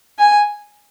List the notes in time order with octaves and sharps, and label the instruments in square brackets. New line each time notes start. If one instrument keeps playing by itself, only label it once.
[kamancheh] G#5